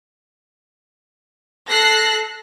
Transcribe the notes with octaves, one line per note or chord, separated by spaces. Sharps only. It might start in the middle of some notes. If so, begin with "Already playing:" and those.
A4 F#6 A#6 C7